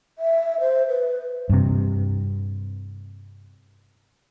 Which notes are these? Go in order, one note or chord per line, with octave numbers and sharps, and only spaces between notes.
E5
C5
B4
G2 C3